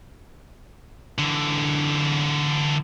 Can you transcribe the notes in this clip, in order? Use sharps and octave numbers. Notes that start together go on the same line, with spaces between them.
D3 E3